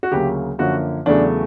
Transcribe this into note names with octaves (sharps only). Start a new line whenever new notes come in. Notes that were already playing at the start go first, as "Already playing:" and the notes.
F#4
D2 C#3 F#3 A#3 G4
F#2 D3 F3 A#3 F#4
E2 C#3 F#3 A3 D4